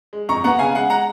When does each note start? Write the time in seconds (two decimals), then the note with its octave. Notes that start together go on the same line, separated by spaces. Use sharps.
0.13 G#3
0.29 F2 A#5 C#6
0.44 B3 F#5 A#5
0.59 C#3 F5 G#5
0.74 G#3 F#5
0.90 F#5 A#5